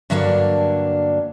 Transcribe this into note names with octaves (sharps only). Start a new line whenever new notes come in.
G2 D3 F#3 A#3 D4